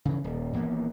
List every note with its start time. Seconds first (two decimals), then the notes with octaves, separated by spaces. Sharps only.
0.05 C#3 E3
0.24 D#1
0.53 D#1 E3 A#3 B3